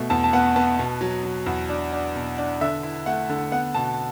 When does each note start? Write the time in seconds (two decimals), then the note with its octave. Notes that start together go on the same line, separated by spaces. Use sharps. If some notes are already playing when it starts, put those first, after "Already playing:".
Already playing: B2 A3
0.10 E2 A5
0.24 A5
0.33 B3 F#5
0.56 B3 A5
0.79 B2
1.01 F#3
1.24 F#3
1.46 E2
1.69 D4
1.93 D4
2.16 B2
2.38 D4
2.61 D3 E5
2.83 E4
3.06 A3 F#5
3.29 D3
3.51 B3 F#5
3.75 B2 A5